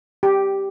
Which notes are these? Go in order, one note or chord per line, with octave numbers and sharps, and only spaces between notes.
G4